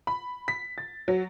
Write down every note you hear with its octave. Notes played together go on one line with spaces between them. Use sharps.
B5
B6
A6
F#3